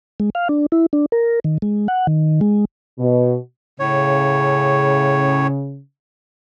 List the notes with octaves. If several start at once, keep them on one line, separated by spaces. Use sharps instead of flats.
G#3
F5
D4
E4
D4
A#4
D#3
G#3
F#5
D#3
G#3
B2
A2 C#3 C#5